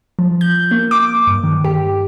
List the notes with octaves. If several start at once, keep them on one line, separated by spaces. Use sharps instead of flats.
F3
G6
A#3
D6
G2
D#3
G4